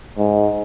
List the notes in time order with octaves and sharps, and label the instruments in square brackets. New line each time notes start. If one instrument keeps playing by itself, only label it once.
[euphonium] G#2